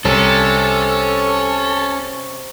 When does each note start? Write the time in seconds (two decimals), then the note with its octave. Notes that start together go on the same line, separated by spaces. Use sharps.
0.05 C2 C3 C#4 A4